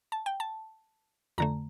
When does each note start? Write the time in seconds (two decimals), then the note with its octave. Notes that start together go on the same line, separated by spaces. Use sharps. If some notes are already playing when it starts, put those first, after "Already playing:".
0.12 A5
0.26 G5
0.40 A5
1.38 F2 D3 A3 A#5